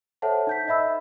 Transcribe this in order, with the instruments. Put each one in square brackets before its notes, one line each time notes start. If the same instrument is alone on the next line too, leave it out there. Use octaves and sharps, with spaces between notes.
[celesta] A4 C5 C#5 E5 F#5 A5
D#4 G6 B6
D#5 E5 B5 E6